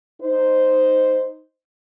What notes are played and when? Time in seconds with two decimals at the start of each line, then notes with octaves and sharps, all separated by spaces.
0.20 D#4 C5